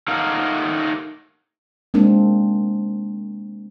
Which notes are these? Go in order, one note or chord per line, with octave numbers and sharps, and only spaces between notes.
A3 D#4 G4 A#4 F5 F#5
G#3 A#3 C4 D4